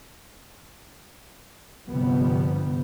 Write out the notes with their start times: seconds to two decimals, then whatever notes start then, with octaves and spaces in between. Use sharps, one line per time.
1.90 G1 C3 F3 G3 B3